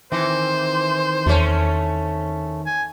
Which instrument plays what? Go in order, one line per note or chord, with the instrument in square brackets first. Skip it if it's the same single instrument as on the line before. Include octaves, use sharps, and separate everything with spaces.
[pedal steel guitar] D#3 C4 [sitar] E3 [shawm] C5
[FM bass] E2 [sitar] A3 C#4
[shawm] G#5